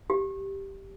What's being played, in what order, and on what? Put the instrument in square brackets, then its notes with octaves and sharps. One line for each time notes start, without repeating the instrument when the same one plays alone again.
[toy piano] G4